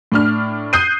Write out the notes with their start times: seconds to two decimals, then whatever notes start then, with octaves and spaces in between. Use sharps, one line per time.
0.12 A2 D4 F6
0.73 D#6 F#6 G6 C7 D#7